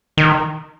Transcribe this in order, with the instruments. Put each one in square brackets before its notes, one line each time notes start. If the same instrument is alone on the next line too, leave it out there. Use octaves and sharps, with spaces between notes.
[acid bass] D#3